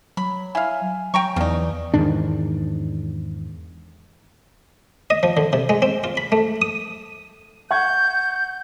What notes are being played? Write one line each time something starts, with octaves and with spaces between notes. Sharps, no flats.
F#3 B5
E4 F5 G#5
F#3 G5 A#5 C#6
E2 C#3 E3 D#4 D5
E2 G#2 D#3 D4
D#5
F3
D3
C3
G#3
C4
F4
B5
A3
D#6
F#5 C#6 G6 G#6